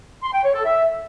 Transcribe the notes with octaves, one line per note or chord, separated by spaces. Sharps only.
C6
G5
C#5
A4
E5